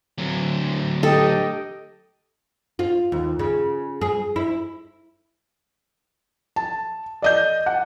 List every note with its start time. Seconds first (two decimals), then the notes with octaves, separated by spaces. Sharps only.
0.18 D2 F#3
1.03 G4 A4 D#5 G5
2.79 F4
3.12 D#2
3.39 C#3
4.01 G#4
4.36 E4
6.56 A5
7.22 D5 D#5 G6
7.66 F#5